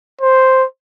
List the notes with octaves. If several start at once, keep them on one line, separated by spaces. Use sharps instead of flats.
C5